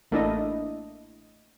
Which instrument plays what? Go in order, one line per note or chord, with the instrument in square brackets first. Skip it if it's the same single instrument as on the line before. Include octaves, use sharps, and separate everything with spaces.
[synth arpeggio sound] A1 A3 A#3 D4 E4 D#5